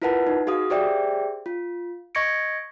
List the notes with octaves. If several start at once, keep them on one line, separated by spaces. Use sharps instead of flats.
E4 F4 A#4 B4 F#5 A5
D#4
F#4 G#4 F5 D#6
G4 G#4 C5 D5 E5 G5
F4
D#5 C#6 G#6 A#6 C#7 D7